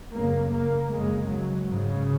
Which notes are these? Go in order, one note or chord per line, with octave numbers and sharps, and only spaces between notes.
F#2 C#3 A#3
A#3
F#2 C#3 G#3
F#3
G#2 C#3